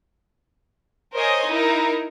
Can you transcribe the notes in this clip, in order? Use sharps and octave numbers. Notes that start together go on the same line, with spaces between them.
A#4 C5 C#5 D#5 G#5
D#4 E4 A#4